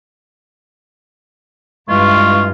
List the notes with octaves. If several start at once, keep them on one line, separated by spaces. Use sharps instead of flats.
G2 E3 G#3 F4 C#6